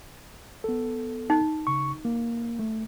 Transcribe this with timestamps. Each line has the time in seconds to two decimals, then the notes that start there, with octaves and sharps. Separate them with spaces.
0.64 B3 A4
1.30 D#4
1.67 C#3 C#6
2.05 A#3
2.59 A3